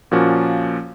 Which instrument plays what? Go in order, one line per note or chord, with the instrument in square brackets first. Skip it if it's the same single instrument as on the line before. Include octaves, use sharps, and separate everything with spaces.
[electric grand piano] A#2 F3 A#3 C#4 F#4